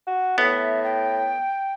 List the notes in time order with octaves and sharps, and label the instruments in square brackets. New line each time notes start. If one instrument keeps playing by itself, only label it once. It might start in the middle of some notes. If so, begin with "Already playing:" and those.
[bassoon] F#4
[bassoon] A2 [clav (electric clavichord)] B3 [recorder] E5
[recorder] G5